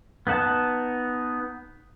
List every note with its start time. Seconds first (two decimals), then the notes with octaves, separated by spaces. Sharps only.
0.27 B3 D#4 F#5 A5